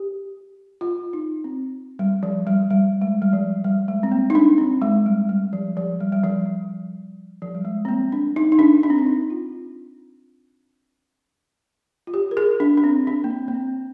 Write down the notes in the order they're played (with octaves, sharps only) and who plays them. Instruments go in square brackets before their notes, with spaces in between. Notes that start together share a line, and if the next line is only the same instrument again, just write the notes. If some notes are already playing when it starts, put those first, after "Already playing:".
Already playing: [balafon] G4
F4
D#4
C4
G3
F3
G3
G3
G#3
G3
F3
G3
G#3
C4
A#3
D#4
D4
C4
G#3
G3
G3
F3
F3
G3
G3
F3
F3
G3
G#3
C4
A#3
D4
D#4
D#4
D4
D4
C4
D4
D#4
F4
F4
G4
A#4
G#4
D4
D4
C4
D4
A#3
C4
A#3
C4